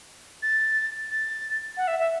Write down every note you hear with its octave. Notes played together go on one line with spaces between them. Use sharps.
A6
A6
F#5
E5
E5